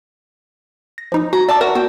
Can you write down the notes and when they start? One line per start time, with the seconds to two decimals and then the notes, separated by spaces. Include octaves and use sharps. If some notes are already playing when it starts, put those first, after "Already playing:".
0.98 A#6
1.12 F3 D#4 D#6
1.33 F#4 A#5
1.49 D5 E5 A5 D6
1.61 F#4 A#4 D5 E5 A#5
1.75 B3 F#4 G5